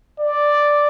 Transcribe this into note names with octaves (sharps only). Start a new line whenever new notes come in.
D5